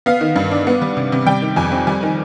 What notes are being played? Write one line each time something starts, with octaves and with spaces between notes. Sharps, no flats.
B3 F5
D#3
G2
D4
B3
G3
C3
C3
G3 G5
D#3
F2 G#5
C4
G3 G#5
D#3